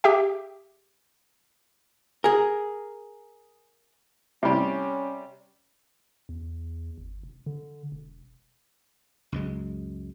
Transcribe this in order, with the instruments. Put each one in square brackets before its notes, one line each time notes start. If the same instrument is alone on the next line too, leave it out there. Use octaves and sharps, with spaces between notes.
[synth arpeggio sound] G4 G#4 E5 G5
[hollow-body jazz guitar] G#4 A#4 [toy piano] G#5
[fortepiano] C3 G3 [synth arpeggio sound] A3 E4 [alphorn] C#4
[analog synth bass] E2
G1
E1
D3
E1
[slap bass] C#2 F#2 G#3